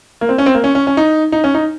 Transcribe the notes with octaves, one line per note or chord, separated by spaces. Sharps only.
A#3
C4
C#4
C4
A#3
C#4
C#4
C#4
D#4
D#4
C#4
D#4